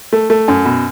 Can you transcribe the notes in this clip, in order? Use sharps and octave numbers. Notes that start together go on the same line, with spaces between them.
A3
A3
F#2
B2